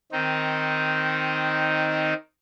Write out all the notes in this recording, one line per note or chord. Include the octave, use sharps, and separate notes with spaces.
D#3 C4 D#4